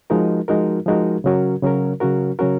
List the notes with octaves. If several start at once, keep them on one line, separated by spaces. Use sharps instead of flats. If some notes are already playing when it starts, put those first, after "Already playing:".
F3 G#3 D#4 F#4 A#4
F3 G#3 D#4 F#4 A#4
F3 G#3 D#4 F#4 A#4
C#3 F#3 C#4 F#4 A#4
C#3 F#3 C#4 F#4 A#4
C#3 F#3 C#4 F#4 A#4
C#3 F#3 C#4 F#4 A#4